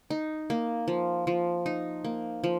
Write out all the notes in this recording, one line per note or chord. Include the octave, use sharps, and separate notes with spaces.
D#4
A#3
F3
F3
D#4
A#3
F3